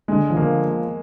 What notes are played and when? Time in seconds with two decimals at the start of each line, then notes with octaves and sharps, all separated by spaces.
0.08 D3 G#3
0.30 F3
0.37 A#3